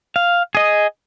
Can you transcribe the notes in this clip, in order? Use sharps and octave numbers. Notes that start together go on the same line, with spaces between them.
F5
G#4 D#5